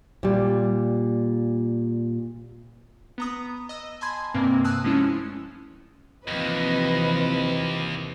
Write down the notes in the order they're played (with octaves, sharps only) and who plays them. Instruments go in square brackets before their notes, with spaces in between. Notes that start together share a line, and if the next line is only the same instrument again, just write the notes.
[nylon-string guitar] A#2 G3
[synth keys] B3 A#5 D#6
D#5 D#6 E6
G#5 A5 B5 C6 G#6
G2 C3 A#3 C4
G#5 A5 D#6 E6 F#6
F3 G#3 A3 C#4 E4
[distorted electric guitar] D#2 [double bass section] C3 E3 C4 [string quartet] F3 B4 D#5